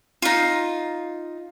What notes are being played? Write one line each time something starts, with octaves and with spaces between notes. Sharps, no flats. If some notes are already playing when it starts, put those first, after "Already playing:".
D#4 F4